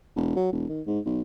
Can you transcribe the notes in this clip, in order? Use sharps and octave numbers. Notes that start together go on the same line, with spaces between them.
E1
F#3
E1
D#3
G#2
B1